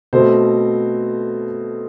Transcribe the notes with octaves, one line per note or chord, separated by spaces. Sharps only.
B2 A3 C4 C5